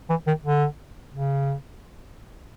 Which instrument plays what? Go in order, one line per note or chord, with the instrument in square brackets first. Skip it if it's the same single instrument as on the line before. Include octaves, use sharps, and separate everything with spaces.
[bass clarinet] E3
D#3
D3
C#3